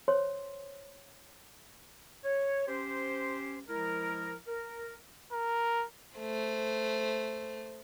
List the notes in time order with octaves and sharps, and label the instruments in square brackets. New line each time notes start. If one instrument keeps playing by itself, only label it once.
[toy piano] C5 C#5 C6
[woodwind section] C#5
C#4 G4 C5
F3 G#3 E4 A#4
A#4
[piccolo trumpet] A#4
[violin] A3 C5